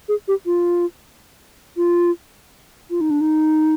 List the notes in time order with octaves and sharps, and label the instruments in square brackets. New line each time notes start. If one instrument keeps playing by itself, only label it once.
[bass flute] G#4
G4
F4
F4
F4
D#4
D4
D#4